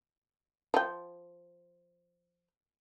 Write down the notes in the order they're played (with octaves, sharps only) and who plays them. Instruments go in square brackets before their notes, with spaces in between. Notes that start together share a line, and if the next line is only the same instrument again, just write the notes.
[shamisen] F3 G5